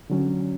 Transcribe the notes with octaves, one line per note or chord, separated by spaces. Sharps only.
D3 F#3 C#4